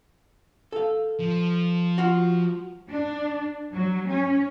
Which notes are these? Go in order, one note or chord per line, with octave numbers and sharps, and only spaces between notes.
A4 F5
F3
F4 F#4
D4
F#3
C#4